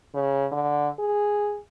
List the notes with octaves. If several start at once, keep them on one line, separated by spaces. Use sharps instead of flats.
C#3
D3
G#4